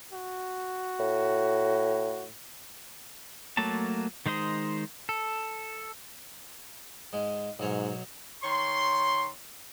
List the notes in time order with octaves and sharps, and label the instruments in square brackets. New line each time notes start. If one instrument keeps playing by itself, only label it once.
[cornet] F#4
[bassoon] A2
[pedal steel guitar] F#3 A3 A#3 A5
D#3 G#3 D#4 C5 D#5
A4
[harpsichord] G#2 G#3
[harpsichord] B1 F#3 C#5 [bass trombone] G#2
[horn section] D#3 C#5 C6